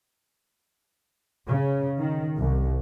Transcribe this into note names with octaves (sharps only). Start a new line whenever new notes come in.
C#3
D#3
C2